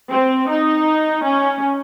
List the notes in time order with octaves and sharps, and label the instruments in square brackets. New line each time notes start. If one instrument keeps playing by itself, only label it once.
[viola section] C4
D#4
C#4